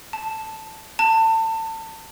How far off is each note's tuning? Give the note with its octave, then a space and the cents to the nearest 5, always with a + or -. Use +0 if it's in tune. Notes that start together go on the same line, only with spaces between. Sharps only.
A5 +5
A5 +30